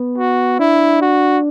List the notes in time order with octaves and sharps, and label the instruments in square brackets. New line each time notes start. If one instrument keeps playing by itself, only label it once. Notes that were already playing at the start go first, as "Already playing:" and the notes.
Already playing: [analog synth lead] B3
[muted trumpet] F#4
[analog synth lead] D4 [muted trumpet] E4
[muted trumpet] F#4